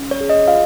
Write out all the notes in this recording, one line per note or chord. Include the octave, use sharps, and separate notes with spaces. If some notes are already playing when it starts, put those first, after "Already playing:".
Already playing: C#4
C#5
G#4
D#5
F4 F5